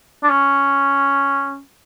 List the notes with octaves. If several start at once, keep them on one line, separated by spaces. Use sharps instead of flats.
D4
C#4